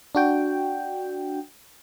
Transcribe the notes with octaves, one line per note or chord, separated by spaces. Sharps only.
D4 F#4 G5